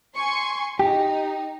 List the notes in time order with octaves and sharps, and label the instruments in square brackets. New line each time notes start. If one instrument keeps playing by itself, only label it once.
[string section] G#5 C6 C#6
[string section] D#4 [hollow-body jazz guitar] G4